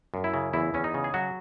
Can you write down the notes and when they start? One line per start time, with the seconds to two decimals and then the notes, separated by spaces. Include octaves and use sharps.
0.14 F#2
0.24 E4
0.34 C#3
0.53 E2 E4
0.74 E2 C#4
0.84 D#4
0.94 C#3
1.04 G#4
1.14 F#3 F#4